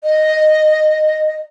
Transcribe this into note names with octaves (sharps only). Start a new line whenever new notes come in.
D#5